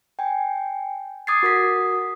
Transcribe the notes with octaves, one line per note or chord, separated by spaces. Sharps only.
G5 G#5
D6 D#6 G#6 A6 C7
F#4 A#4 D#6 B6